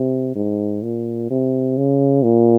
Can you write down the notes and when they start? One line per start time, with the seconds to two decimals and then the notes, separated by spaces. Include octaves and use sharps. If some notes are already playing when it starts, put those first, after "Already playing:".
Already playing: C3
0.35 G#2
0.83 A#2
1.30 C3
1.78 C#3
2.24 A#2